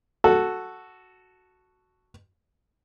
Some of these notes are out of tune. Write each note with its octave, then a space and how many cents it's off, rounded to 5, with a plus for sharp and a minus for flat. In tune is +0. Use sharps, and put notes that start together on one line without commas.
F#4 +0 A4 +0